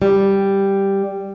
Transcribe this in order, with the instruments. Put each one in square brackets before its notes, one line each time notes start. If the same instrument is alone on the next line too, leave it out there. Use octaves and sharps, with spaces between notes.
[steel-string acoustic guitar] G3